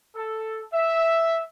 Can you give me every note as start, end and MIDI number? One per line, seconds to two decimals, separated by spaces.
0.15 0.61 69
0.73 1.41 76